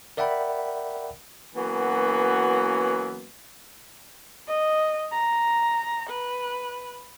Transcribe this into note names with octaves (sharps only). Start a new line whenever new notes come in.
A#4 D5 E5 F#5 G5 B5
E3 F#3 A#3 B3 C#4 F#4
D#5
A#5
B4